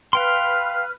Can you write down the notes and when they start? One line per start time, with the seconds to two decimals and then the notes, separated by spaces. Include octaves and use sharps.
0.13 B4 F5 G5 C6 F6